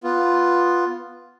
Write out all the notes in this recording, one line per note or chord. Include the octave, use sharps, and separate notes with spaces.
B3 F4